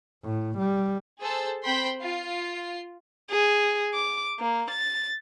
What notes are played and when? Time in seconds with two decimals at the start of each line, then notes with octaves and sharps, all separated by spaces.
0.25 A2
0.58 G3
1.20 G#4 A4 C5 A5 E6
1.63 C4 C5 G5 B5 C6 B6
2.02 F4 C7
3.31 G#4
3.94 D6
4.40 A#3
4.71 A6